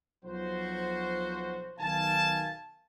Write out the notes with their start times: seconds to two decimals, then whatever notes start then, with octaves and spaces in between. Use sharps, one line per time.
0.24 B1 F3 F#3 F#4 C5
1.79 B1 D#3 F5 G#5 A5